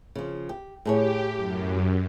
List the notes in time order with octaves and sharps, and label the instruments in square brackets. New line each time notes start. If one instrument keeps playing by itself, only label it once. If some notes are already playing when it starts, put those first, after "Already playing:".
[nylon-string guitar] C#3 F3
G4
[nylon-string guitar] A2 G#4 C#5 [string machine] G4
[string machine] F#2